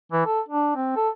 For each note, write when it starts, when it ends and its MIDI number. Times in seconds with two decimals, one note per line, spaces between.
0.12 0.24 52
0.26 0.40 69
0.49 0.71 62
0.76 0.92 60
0.96 1.09 69